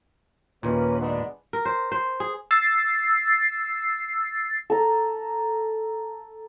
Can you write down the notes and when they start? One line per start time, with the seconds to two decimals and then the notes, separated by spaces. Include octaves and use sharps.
0.63 D#2 A#2 A#3 C#4 B4
0.99 G#2 B3 D4
1.53 A#4
1.65 C5
1.92 C5
2.20 G#4
2.51 E6 A6 C7
4.70 A4 A#5